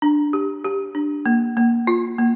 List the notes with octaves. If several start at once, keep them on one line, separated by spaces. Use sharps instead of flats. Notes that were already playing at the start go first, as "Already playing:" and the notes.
D4
G4
G4
D4
A#3
A#3
F4
A#3